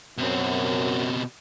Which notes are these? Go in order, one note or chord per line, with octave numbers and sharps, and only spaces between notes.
F#2 B2 C4